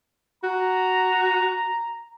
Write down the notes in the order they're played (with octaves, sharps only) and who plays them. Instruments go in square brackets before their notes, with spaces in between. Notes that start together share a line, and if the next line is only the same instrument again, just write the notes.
[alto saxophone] F#4 [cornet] A#5